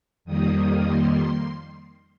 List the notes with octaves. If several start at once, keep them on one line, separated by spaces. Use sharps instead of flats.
F2 D#3 G3 A#3 D#6
C6